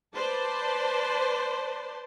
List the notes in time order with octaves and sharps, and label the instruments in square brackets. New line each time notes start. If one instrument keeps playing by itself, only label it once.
[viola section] B4 C5 D5 A5